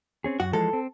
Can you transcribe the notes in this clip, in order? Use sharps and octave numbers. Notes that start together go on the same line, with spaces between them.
C4 C#4 G#4
F#2 F#4
E3 F3 G#3 A4
C4